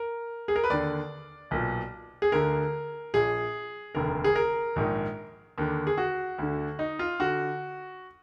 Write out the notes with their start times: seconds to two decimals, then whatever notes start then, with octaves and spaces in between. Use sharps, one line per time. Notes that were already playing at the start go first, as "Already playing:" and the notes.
Already playing: A#4
0.48 G#4
0.56 A#4
0.64 B4
0.70 D#2 D3 D5
1.51 B1 A#2
2.22 G#4
2.32 D2 D3 A#4
3.14 A#1 A#2 G#4
3.95 F1 D#2 D3 A#4
4.24 G#4
4.36 A#4
4.76 A#1 G#2 D#3
5.58 D#2 D3
5.87 G#4
5.98 F#4
6.38 D2 D3
6.79 D#4
6.99 F4
7.20 D3 F#4